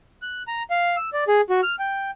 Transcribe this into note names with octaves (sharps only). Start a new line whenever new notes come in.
F#6
A#5
F5
E6
D5
G#4
F#4
F6
G5